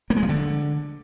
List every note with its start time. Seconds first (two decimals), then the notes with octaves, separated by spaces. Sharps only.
0.10 A#3
0.16 G#3
0.23 F3
0.29 D3